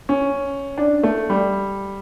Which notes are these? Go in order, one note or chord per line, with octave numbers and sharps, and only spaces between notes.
C#4
D4
A3
G3